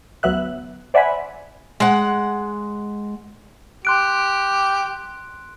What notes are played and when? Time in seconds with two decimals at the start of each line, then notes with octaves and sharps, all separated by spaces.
0.23 D2 F#3 B3 E5 F#6
0.94 C5 D5 E5 F#5 G#5 B5
1.80 G#3 F#5
3.85 G4 C6 F#6 D7